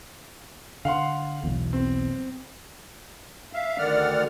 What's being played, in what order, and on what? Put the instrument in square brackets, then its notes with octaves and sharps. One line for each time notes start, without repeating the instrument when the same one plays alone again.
[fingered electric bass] D3 [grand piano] F5 F#5 C6
[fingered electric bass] B1 E2
[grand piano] C4
[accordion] E5 F5
D2 D3 D#3 D5 F#5 F6